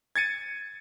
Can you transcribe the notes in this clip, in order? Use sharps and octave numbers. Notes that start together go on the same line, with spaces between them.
G#6 A6 C#7 D#7